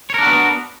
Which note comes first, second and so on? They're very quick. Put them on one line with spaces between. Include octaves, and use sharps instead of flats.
C#5 A#4 D4 F#4 B3